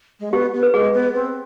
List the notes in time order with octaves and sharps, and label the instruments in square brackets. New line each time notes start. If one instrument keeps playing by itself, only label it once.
[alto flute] G#3
[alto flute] B3 [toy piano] G4
[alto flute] B3
[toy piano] B4
[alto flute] G#3 [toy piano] G#4
[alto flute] B3
C4